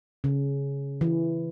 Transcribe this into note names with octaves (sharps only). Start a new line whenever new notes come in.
C#3
E3